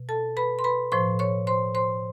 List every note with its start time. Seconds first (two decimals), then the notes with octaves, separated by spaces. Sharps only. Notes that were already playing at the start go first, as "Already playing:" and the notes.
Already playing: B2
0.09 A4 A5
0.37 B4 B5
0.59 C6
0.64 B4 B5
0.92 A2 F3 C5 C6
1.19 C#5 C#6
1.47 C5 C6
1.75 C5 C6